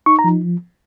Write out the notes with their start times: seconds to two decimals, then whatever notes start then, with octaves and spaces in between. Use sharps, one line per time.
0.06 D#4 C#6
0.19 A#5
0.24 F3